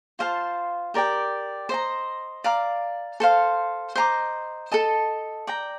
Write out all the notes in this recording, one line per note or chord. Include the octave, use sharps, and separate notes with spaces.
F4 C5 F5 A5
G4 A#4 D5 G5
C5 D#5 A#5
D5 F5 A#5 D6
A4 C5 F5
C5 D#5 A#5 D6
A4 D#5 A5
D5 G5 A#5